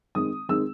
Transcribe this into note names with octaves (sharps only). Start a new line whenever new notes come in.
D#3 G#3 C4 D#6
D#3 G#3 C4 E6